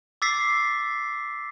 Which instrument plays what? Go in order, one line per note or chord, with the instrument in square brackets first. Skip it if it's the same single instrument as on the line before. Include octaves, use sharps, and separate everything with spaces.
[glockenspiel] D6 E6 A6 B6 C7